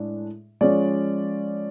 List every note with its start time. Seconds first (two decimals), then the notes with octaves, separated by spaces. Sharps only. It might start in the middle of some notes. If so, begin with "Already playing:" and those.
Already playing: A2 G#3 D4
0.61 F3 G#3 C#4 D5